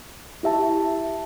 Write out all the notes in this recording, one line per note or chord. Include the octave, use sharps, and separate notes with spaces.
E4 G4 E5 A5